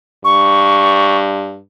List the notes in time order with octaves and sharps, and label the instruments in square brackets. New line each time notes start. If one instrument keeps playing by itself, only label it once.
[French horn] G2 [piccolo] C#6